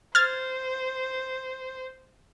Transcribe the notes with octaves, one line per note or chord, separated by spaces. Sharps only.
C5 F6 G#6 A6